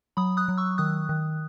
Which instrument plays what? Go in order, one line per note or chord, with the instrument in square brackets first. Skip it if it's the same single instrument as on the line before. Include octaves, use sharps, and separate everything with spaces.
[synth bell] F#3 B5 D#6
D#6 F#6
F#3
C#6 E6
D#3 D#6 F#6
D#3